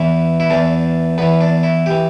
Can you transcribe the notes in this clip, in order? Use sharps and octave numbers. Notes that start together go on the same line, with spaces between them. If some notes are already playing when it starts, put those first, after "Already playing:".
Already playing: E2 E3 E4
E4
E2 E3 D4
E2 E3 B3
D4
E4
E3 G4